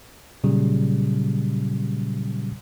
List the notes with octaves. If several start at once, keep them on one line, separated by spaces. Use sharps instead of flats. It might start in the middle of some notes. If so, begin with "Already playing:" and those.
A#2 C#3 F#3 G3